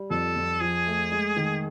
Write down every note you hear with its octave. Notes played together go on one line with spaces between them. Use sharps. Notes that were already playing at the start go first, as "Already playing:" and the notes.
Already playing: G3
F2 A4
F2
F3 G#4
A3
G#3
D#3